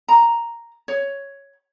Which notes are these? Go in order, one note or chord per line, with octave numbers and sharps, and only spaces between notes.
A#5
C#5